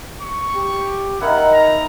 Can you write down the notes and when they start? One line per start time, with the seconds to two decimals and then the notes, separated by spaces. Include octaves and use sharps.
0.22 C#6
0.56 G4
1.21 D#3 D#4 E4 A#4 F#5
1.53 A#5